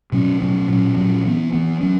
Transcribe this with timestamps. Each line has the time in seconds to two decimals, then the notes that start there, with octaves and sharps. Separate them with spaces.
0.12 B2 F#3 C#4
0.40 B2 F#3 C#4
0.68 A#2 F#3 C#4
0.96 A#2 F#3 C#4
1.24 E3 B3
1.53 E3 B3
1.81 F#3 C#4